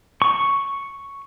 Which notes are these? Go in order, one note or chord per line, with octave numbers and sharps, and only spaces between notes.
C#6